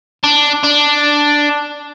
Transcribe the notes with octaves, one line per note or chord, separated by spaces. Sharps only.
D4
D4